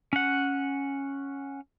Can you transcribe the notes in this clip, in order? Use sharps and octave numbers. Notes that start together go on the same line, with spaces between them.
C#4 F#5